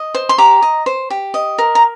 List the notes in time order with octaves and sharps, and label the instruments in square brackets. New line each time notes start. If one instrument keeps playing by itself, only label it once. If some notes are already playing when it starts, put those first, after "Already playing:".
Already playing: [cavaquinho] D#5
C5
C6
G4 A#5 D6
D#5
C5
G4
D#5
A#4
A#5